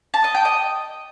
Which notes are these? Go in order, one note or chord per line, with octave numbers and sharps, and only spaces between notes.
A5
D#5
G5
D#5